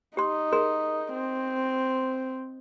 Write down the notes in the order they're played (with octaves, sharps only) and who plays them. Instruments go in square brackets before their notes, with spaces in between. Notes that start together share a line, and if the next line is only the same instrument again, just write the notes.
[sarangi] D#4 [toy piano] G4 C6
[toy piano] G#4 A#4 C6
[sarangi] C4